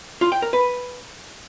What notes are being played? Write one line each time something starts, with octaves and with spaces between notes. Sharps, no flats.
F4
G5
A#4
B4